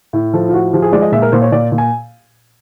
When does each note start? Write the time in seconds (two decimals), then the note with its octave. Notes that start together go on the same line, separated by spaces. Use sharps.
0.13 A2
0.33 F3 A4
0.49 F4
0.53 A2 F#4
0.73 F3 G4
0.82 G#4
0.92 G#3 D5
1.02 D#5
1.12 A#2 E5
1.22 A#4
1.32 A#2 C5
1.42 C#5
1.52 A#2 D5
1.72 A#2
1.78 G#5